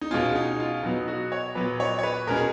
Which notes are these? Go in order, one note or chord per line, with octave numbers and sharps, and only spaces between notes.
D#4
B2 G#3 C#4 F4
D#4
F4
B2 F#3 B3 D#4
F#4
C#5
A#2 F#3 B3 B4
C#5
C#5
B4
B2 G#3 C#4 A#4
G#4